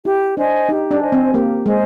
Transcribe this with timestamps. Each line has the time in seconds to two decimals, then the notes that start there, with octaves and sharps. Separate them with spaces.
0.05 E4 G4
0.37 D4 C5 D#5 G#5
0.69 D#4 G4
0.91 D4
1.01 C5 D#5 G#5
1.12 C4
1.33 A#3 G4
1.66 G#3 C5 D#5 G#5